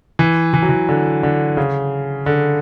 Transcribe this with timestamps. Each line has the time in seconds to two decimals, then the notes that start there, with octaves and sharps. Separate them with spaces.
0.19 E3
0.54 E3
0.62 F#3
0.69 E3
0.89 D3
1.23 D3
1.57 C#3
2.26 D3